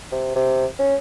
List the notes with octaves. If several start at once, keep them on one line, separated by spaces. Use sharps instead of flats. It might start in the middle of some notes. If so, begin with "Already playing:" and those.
C3
C3
C#4